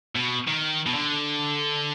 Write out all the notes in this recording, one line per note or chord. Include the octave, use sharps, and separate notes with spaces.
B2
D#3
B2
D3